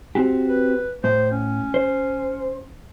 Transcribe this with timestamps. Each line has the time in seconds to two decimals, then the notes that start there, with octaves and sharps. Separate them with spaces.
0.15 C4 F#4 G4
0.48 B4
1.04 A2 C5
1.31 C#4
1.74 C5